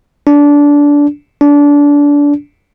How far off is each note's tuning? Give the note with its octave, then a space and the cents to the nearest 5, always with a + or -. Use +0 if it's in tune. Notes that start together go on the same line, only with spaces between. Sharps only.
D4 -20
D4 -25